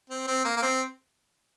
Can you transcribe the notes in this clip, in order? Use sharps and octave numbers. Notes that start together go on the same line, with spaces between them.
C4
C4
A#3
A#3
C4